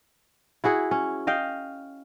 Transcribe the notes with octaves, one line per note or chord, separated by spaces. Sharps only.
E4 F#4 G#4 F#5
C#4
D#5 F5 G5